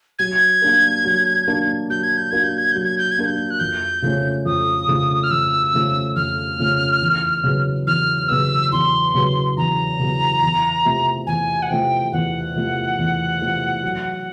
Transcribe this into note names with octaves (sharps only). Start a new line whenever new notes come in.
F#3 G#6
A#3 D4 F#4 A#4
F#3
A#3 D4 F#4 A#4
F#3 G6
G#6
G6
A#3 D4 F#4 A#4 G#6
G6
G#6
F#3 G6
G#6
G6
G#6
A#3 D4 F#4 A#4
G6
F#6
F2 G6
C#3 F3 A3 C#4
F2 D#6
C#3 F3 A3 C#4
F6
F2 E6
C#3 F3 A3 C#4
F2 F6
C#3 F3 A3 C#4
E2
C#3 F#3 B3
E2 F6
C#3 F#3 B3 E6
E2 C6
C#3 F#3 B3
E2 A#5
C#3 F#3 B3
E2
C3 F3 A3
E2 G#5
F#5
C3 F3 A3 G5
E2 F#5
C3 F3 A3
E2
C3 F3 A3
F#3